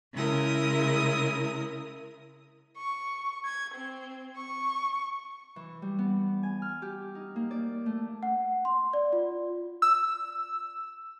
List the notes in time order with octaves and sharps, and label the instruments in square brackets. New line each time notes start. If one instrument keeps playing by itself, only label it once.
[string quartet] C#3 G#3 E4 A#4 D#6
[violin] C#6
G#6
C4
C#6
[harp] E3
G3
B3
G#5
F6
G4
D#4
A#3
D5
A3
[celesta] F#5
C6
D5
F4
[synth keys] E6